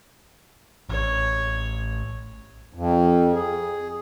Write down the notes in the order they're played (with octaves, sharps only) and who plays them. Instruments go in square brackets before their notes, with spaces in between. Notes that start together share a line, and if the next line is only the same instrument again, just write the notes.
[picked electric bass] A1 [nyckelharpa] C#5
[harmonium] F2
G#4